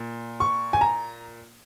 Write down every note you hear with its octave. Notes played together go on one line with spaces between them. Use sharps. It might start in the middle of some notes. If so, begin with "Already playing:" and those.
Already playing: A#2
C#6
G#5
A#5